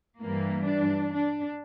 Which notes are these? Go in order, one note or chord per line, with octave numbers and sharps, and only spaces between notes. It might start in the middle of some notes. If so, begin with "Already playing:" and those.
G2 E3 G3 A#3
D4
D4